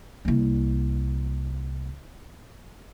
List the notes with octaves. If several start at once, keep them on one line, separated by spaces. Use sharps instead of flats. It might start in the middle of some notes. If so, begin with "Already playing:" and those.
C2 A#3